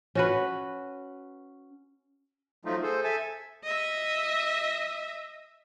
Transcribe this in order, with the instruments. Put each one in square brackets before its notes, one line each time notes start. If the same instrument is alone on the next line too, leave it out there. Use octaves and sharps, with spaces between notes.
[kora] C#4 F#4 B4
[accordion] F3 F#3 A3 D#4 F4
G#4 A4 C5
A4 E5 G#5 A5
[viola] D#5 E5